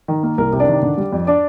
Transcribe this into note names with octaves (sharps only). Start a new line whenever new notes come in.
D#3
A#3
C2 A#4
C3
D4 D5
D#3
D3
G3
F2
D4 D5